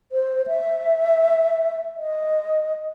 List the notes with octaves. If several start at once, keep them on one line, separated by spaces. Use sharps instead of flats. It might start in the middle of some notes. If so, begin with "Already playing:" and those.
C5
E5
D#5